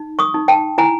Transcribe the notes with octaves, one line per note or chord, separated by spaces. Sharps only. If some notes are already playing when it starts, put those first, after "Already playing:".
Already playing: D#4
C#6 D#6
D#4
G5 A5
E4 G#5 A#5